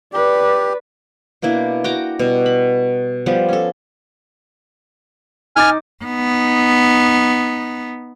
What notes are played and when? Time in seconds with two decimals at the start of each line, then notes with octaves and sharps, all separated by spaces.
0.13 G4 B4 D5
1.42 B2 A#3 D4 E4
1.84 F#4 G5 A#5 D6
2.19 B2 G3
2.46 B5
3.26 F3 G3 B3
3.49 C#4 A4
5.56 D#4 G#5 D6 F6 A6
6.04 B3 D#4